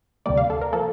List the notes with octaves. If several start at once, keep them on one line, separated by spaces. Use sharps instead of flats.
D2 C3 G3 A#3 D5
F5
A4
A#4
F3 A#3 A4